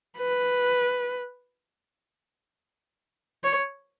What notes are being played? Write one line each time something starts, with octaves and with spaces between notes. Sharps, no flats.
B4
C#5